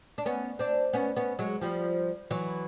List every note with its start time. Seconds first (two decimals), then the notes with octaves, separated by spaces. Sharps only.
0.18 D4
0.26 B3 C#4
0.59 C4 D4
0.93 B3 C#4
1.16 B3 C#4
1.39 F#3 G#3
1.61 F3 G3
2.31 E3 F#3